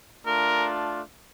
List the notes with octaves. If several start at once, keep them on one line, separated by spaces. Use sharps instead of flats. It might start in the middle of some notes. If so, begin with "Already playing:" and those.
A3 D4 F4 A#4